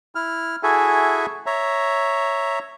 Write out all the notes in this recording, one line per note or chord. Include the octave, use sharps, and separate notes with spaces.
E4 F6
E4 F#4 G#4 A4 E5 G#5
C#5 E5 A#5